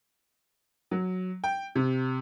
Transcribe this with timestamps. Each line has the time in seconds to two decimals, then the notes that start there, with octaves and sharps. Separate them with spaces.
0.91 F#3
1.44 G5
1.75 C3